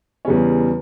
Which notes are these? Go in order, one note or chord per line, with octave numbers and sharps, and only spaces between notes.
E2 C#3 G3 C#4